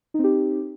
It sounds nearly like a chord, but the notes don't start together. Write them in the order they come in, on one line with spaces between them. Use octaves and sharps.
D#4 C4 G4